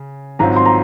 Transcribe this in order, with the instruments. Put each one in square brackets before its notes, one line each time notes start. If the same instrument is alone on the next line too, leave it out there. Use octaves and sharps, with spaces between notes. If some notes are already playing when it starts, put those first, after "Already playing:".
Already playing: [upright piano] C#3
[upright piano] G#1 G#2 F#3 C4 F4 [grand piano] A#5
[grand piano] C6
A#5